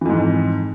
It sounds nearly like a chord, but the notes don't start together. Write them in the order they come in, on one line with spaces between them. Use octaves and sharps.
E3 F2 G#2